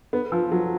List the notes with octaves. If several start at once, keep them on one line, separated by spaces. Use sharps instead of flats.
B3
F3
F#3